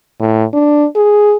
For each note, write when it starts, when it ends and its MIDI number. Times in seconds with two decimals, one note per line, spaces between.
0.20 0.44 45
0.54 0.86 62
0.96 1.36 68